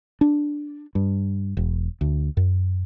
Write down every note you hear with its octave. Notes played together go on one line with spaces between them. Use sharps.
D4
G2
E1
D2
F#2